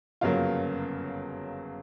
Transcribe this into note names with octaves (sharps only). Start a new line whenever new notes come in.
G1 F#2 C#3 F#3 A#3 F4 F5